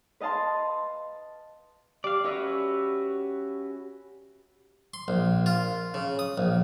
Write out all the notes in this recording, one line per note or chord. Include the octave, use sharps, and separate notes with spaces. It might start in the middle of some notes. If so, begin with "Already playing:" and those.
B4 D#5 F5 A5 C6
G3 D5 F5
C#4 F#4 B4 E5 E6
C6
A#1
F4
C#3
D#6
A#1